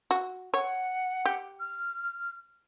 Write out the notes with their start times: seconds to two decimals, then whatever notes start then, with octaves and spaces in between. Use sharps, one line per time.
0.11 F#4
0.54 C#5 F#5
1.26 G4
1.60 F6